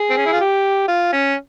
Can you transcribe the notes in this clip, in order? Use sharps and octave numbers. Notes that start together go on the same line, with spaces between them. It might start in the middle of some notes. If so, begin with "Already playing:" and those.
Already playing: G#4
C4
C#4
E4
F4
G4
F4
C#4